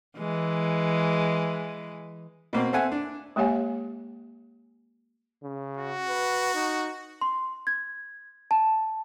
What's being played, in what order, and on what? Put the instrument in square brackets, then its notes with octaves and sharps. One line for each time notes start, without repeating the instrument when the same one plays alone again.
[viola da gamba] E3 G#3
[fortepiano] B2 A#3 C4
C4 A4 E5 F#5 G#5
D4
[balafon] G#3 A#3 G4 C#5 F5 G#5
[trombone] C#3
[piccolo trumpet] F#4
[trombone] B4
D#4
[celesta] C6
G#6
A5